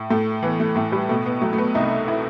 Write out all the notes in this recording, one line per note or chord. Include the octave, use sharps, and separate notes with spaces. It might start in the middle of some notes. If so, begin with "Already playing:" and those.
Already playing: A2
A2 A3
E3 B3
A3
A2 A3
G3
B2 A3
B3
F#3 A3
A3
B3
C2 D#4
E4